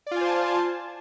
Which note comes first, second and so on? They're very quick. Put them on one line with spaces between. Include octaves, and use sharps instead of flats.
D5 F4 G#5 C5 A5